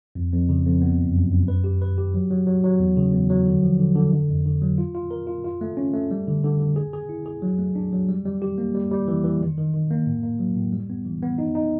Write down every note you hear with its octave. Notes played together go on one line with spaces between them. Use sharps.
F2
F2
C#3
F2
B3
F#2
F#2
F#2
B4
G4
B4
G4
F#3
F#3
F#3
F#3
E2
C#3
E2
F#3
D3
F3
D3
D3
D3
F2
D3
F#3
F4
F4
A#4
F4
F4
A3
C#4
A3
G3
D3
D3
D3
G#4
G#4
E4
G#4
F#3
A3
D4
F#3
G3
G3
G4
A#3
G3
G3
E3
E3
D#3
D#3
D#3
A#3
A2
A#3
F#3
A2
G3
B3
E3
B3
D#4
D#4